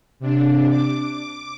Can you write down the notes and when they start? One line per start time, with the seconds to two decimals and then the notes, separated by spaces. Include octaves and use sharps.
0.20 C3 D4
0.70 D6